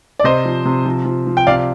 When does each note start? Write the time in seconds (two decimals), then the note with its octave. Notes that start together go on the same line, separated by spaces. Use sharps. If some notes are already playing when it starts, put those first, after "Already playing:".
0.19 D5
0.24 C3 C5 D#5
0.45 F3
0.65 C3
0.86 F3
1.05 F3
1.27 F3
1.37 G5
1.47 C3 D5 F5